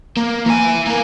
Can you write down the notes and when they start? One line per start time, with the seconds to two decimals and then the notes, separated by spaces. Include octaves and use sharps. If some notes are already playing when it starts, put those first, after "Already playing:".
0.17 A#3
0.46 E3 G#5
0.87 A#3 A#4